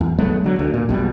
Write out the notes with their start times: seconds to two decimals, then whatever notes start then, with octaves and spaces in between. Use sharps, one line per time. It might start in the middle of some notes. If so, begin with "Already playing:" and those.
0.01 E2
0.19 F#3 G#3 A3 B3
0.44 D3 F#3
0.59 D2
0.74 A#2
0.89 A#1 F#2 B2 G3